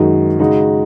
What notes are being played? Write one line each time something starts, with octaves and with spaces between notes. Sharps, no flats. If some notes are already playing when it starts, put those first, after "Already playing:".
Already playing: F#2 D#3 G#3 D#4 F#4
C#3 G#3 D#4 F#4